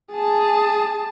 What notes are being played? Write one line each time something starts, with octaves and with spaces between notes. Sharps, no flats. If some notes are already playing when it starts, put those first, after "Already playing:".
G#4 A5